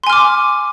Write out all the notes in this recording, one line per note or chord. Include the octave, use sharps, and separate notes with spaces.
G#5 C6 D6 F6